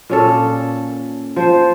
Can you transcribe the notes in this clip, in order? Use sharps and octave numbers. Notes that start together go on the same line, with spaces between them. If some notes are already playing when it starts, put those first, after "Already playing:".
A#2 C#4 A4
F3 C5